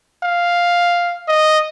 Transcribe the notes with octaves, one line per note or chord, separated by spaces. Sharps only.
F5
D#5